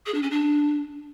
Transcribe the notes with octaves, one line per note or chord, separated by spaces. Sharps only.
G#4
D4
C#4
D4